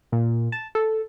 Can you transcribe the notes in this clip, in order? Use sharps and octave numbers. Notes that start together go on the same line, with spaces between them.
A#2
A5
A4